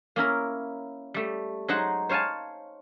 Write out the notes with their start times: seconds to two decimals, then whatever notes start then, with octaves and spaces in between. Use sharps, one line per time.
0.16 A#3 C#4 E4 A#4
1.14 G3 A3
1.68 F#3 G#3 D#4 C5 F#5
2.09 C5 C#5 F5 G#5 A5